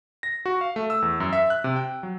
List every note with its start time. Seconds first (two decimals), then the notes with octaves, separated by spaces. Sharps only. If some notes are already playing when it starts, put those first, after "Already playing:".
0.23 A#6
0.46 F#4
0.61 F5
0.76 A3
0.90 E6
1.02 E2
1.20 F#2
1.33 E5
1.50 F#6
1.64 C3
1.76 G5
2.03 F#3